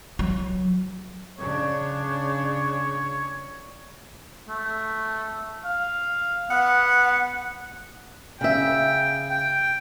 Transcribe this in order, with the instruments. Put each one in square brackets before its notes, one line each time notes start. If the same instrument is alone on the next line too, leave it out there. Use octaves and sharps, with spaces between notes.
[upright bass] F#3
[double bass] C#3 D4 [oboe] C#5
[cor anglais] A3
F5
[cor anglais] B3 [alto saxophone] F#5
[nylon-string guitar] C#3 E5 [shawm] G5
[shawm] G5